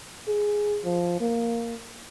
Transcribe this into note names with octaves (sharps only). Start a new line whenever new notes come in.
G#4
F3
A#3